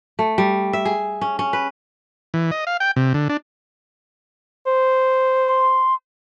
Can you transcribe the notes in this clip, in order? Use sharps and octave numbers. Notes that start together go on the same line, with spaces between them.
A3
G3
E5
G#4
C#4
C#4
B4
E3
D#5
F5
G5
C3
D3
D4
C5
C6